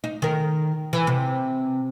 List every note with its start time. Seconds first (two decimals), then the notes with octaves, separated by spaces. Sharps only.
0.04 D#4
0.22 D#3 A#4
0.93 E3
1.07 C3